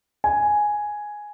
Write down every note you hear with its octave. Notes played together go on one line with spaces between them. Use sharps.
G#5